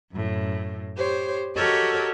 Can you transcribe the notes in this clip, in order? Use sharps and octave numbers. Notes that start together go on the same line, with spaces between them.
F#2 A2
G4 C5 C#5
F#4 G4 A4 A#4 C#5 D#5